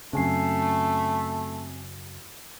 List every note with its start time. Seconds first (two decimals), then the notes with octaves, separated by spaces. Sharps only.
0.13 F#2 C#3 A3 C4 G#5 C7